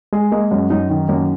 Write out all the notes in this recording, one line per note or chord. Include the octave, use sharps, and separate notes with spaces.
G#3 G#4
G#3 A#3
F#2
F#2 D#4
D#3
F#2 A#3